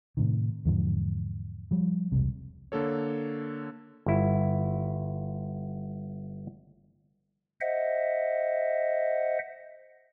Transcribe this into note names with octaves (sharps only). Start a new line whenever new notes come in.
A2 C3 D#3
E2 G#2 D3 F3
F3 G3
E1 C2 C3
D3 A#3 A4 C#5
G1 E4
C5 D#5 E5 F#5